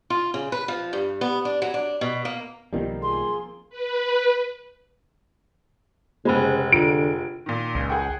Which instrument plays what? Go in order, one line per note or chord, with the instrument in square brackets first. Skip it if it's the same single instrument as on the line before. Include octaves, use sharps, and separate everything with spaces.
[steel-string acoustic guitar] F4
C#3
B4
F3
G2
B3
D4
F#3
D4
B2
A#3
[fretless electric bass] B1 D#3 G3 [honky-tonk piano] F3 A#3 C4
[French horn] G#4 [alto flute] C6
[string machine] B4
[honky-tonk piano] F1 G#3 [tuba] C#3 [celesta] C5 B5
[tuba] D3 [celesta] F4 [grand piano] D7
[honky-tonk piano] A#2 D#3
[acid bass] C#2
[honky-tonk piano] G#4 F#5 G5